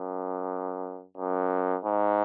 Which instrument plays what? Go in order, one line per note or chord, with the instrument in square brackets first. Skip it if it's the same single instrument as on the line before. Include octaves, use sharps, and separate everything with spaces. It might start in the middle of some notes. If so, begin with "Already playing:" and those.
Already playing: [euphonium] F#2
F#2
G#2